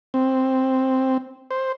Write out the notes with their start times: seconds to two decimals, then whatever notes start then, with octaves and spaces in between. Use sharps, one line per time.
0.14 C4
1.51 C5